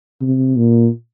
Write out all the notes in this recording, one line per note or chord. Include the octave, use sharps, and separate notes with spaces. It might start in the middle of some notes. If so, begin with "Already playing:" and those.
C3
A#2